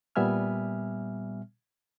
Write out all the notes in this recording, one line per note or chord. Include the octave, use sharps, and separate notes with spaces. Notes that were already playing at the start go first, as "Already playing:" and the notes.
A#2 G3 B3 E5 G#5 F6